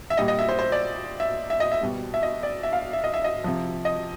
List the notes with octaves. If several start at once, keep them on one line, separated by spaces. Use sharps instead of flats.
E5
A#2 G3 D#5
D#5
E5
C5
C5
D5
E5
E5
D#5
E5
B2 G3
E5
D#5
D5
E5
F5
E5
D#5
E5
D#5
C3 F3
D#5